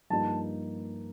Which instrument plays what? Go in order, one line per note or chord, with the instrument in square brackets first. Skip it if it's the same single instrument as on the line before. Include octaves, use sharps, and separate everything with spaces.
[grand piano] G2 F3 A#3 D#4 [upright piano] A5